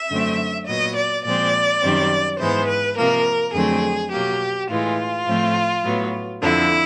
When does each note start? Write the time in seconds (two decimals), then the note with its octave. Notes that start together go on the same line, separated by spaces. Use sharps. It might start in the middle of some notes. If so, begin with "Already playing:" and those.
Already playing: E5
0.10 F#2 D3 F#3 A3 C4
0.68 A#2 F#3 B3 D#5
0.96 D5
1.24 A#2 F3 G#3 C4 D5
1.82 F#2 D#3 G3 C4
2.40 G#2 E3 G#3 B3 C5
2.68 B4
2.96 C3 F3 A#3 A#4
3.54 F2 D3 F#3 A3 C4 G#4
4.12 B2 F#3 A#3 G4
4.69 A2 E3 G#3 F4
5.26 A2 F3 A3 C4
5.84 A2 F#3 B3
6.41 F2 D3 F3 E4